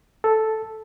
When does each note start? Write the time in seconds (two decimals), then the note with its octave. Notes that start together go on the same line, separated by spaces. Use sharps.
0.24 A4